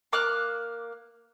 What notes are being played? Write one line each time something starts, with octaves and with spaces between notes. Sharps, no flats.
A#3 D6 F6 F#6